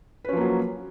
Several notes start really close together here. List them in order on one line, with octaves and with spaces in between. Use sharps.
B4 C#4 F3 A#3 F#3